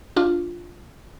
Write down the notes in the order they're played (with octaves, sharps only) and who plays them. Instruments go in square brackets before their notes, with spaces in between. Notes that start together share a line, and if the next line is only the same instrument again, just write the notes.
[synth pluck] D4 F4